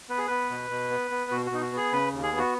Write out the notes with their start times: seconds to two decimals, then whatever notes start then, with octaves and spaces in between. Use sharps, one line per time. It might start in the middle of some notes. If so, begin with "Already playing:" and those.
0.09 B3 B4
0.18 G#4
0.27 B3 B4
0.50 B2
0.70 B2
0.90 B3
1.11 B3
1.31 B2 F#4
1.46 F#4
1.51 B2 D#4
1.61 F#4
1.72 B3 G#4
1.93 C#3 B4
2.13 D#2
2.23 G#4
2.33 B3
2.38 F#4